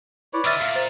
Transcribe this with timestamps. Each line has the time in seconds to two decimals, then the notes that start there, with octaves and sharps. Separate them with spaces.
0.33 E4 B4 C#5 D5
0.45 D3 D#5 E5 E6 F6 A6
0.61 A#2 F5
0.75 C5 A6